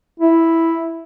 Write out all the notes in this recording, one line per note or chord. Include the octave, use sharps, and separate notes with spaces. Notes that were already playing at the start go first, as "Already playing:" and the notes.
E4